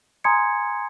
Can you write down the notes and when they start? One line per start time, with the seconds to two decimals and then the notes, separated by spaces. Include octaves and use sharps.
0.24 G#5 A#5 C6 D#6 G#6 C#7